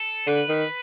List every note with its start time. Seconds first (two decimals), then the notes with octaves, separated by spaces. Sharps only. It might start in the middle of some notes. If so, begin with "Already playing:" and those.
Already playing: A4
0.27 D3 B4
0.49 D#3